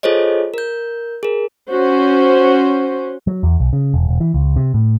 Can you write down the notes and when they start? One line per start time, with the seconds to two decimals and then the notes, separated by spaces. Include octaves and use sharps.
0.03 F4 G#4 A4 C5 C#5 D#5
0.54 A#4 G6
1.23 G#4 A#4
1.71 C#4 F#4 C5
3.27 F#3
3.43 E2
3.60 B1
3.73 C#3
3.94 E1
4.09 E1
4.20 E3
4.34 C#2
4.56 C3
4.74 A2